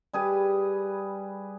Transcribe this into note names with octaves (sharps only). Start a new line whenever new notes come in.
G3 G#4 B4